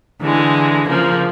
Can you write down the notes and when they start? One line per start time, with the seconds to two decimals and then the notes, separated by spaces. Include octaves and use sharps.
0.21 D3 E3 G#3
0.88 C#3 F3 A#3